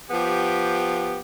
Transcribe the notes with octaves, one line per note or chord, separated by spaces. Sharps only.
F3 B3 G4